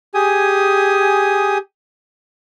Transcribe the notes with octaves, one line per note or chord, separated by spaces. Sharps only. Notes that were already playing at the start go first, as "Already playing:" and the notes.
G4 G#4 G#5 D#6